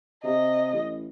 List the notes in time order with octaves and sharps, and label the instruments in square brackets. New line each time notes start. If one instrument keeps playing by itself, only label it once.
[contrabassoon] C3 [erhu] D#5
[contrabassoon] A1